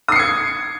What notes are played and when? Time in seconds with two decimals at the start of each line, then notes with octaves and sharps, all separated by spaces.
0.08 D#6
0.12 C7
0.16 C#7
0.19 G#6